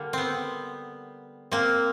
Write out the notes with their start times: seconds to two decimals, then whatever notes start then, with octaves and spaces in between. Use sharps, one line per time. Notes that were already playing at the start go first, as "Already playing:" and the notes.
Already playing: D3 G3 A#3
0.13 B3 C4
1.52 A#3 C4